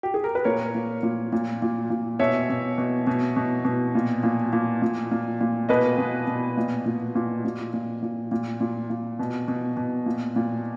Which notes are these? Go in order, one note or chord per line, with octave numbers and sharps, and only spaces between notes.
G4
G#4
A#4
B4
A#2 A#4 C#5
A#2
A#2
A#2
A#2
A#2
B2 C#5 E5
B2
B2
B2
B2
B2
A#2
A#2
A#2
A#2
A#2
A#2
B2 B4 D#5
B2
B2
A#2
A#2
A#2
A#2
A#2
A#2
A#2
A#2
A#2
B2
B2
B2
A#2
A#2